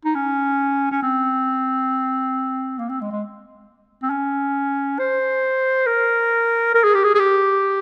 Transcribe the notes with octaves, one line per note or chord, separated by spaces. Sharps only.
D#4
C#4
C#4
C4
A#3
C4
G#3
G#3
C4
C#4
C5
A#4
A#4
G#4
G4
G#4
G#4
G4